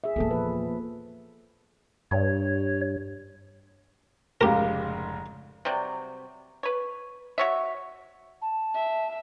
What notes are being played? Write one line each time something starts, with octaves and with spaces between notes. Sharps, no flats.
G#4 E5
E2 A#2 B3 A4
F3 B4
G2 C#5
F1 G#2 C#3 G4 A#4 F5 A#5
C3 F#3 G3
B4 C#5
F#4 C#5 E5
A5
E5